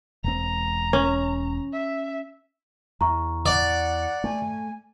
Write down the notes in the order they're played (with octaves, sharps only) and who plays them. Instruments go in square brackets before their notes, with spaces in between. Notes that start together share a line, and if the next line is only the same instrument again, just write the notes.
[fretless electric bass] E1 C4 [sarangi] A#5
[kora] C#4
[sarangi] E5
[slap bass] E2 [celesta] A#5 C#6
[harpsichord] D5 [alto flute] F#5
[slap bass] A3 [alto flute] G#5